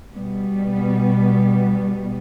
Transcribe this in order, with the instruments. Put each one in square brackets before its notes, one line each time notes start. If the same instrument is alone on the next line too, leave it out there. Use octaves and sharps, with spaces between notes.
[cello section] B2 G3 B3